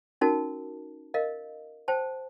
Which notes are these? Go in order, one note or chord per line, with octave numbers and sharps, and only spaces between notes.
C#4 D#4 F#4 A#4 A5
A#4 D#5 F5
C5 G5 A5